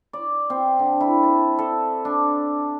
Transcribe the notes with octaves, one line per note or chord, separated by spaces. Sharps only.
D5
C4
D3
E4
A5
A4
D4